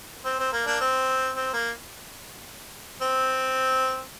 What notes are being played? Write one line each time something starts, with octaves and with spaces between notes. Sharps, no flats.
C4
C4
A#3
A#3 D4
C4
C4
A#3
C4